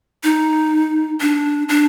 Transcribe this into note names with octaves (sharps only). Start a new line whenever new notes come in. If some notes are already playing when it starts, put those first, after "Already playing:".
D#4
D4
D4